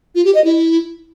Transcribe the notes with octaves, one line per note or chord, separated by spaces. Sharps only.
F4
G4
D#5
E4